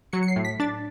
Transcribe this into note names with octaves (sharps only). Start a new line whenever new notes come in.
F#3 C#7
C#7
C7
A2
B6
D4 A6